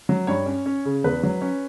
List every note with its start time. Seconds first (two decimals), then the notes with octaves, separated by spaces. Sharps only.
0.09 F#3
0.27 G2 C#5
0.46 C#4
0.66 C#4
0.85 C#3
1.04 E2 B4
1.23 F#3
1.41 C#4